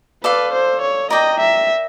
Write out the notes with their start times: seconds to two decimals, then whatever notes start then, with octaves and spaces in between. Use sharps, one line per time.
0.24 A4 B4 D5 F5
0.53 C5
0.82 C#5
1.10 A#4 D5 D#5 G5 A#5
1.39 E5